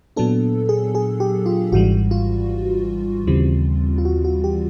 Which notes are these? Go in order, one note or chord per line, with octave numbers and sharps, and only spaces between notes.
A#2 F#3 B3 D4 A4
G#4
G#4
G4
F4
G#1 G#2 E3 G3 F#4
F4
D#2 C#3 E3 G3 C4
F4
F#4
F#4
G4